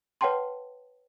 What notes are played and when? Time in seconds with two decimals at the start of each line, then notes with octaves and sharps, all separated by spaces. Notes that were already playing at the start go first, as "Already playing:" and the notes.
0.21 B4 C#5 F#5 G5 A5 C6